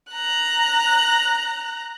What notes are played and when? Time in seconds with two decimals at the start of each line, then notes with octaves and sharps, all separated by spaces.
0.12 A#5 F#6